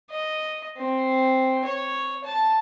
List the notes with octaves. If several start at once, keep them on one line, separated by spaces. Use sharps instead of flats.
D#5
C4
C#5
A5